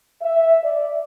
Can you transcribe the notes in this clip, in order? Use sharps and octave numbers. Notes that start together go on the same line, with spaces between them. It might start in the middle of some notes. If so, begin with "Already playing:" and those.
E5
D5